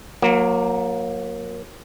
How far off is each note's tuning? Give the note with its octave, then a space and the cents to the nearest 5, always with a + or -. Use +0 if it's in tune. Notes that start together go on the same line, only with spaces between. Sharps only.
F#3 -25 A#3 +10